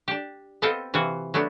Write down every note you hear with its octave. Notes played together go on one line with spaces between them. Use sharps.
D4 G4
B3 C4 A4 D#5 F5 G5
C3 E3 F4 F#4
F#3 A3 B3 D4